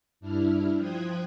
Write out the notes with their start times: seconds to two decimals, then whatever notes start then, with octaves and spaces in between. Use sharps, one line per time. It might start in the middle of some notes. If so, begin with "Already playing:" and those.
0.20 G2 D4 E4 F6
0.76 F3 C5 G5 D#6 F#6 G#6